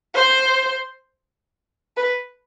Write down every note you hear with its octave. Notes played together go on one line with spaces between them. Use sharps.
C5
B4